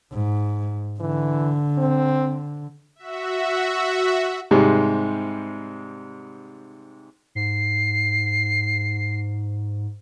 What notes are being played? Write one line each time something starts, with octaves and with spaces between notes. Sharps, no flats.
G#2
D3 E3
C4
F#4 E5
G#2 C3 G3 G#3
G#2 C7